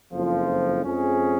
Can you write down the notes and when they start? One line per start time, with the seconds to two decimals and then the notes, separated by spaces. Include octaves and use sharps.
0.13 F#1 F2 F3
0.84 F2 F3 G#3 C#4 G#4